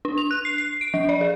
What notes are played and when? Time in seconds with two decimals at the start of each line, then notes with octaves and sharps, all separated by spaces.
0.05 D4
0.18 F7
0.31 F#6
0.45 C7
0.58 C7
0.81 D7
0.94 F3
1.09 D5
1.21 G#4